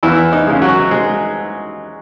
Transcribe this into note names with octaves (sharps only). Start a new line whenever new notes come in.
E2 E3 E4
D#4
C#3 G#3
F#3 F#4
G#3 G#4